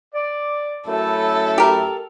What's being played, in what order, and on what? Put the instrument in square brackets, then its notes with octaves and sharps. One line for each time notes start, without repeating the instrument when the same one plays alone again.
[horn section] D5
[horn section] F#2 A3 E4 [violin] A4
[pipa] G4 A#4